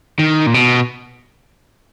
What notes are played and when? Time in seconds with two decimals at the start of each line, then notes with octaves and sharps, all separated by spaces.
0.19 D#3
0.46 A#2
0.54 B2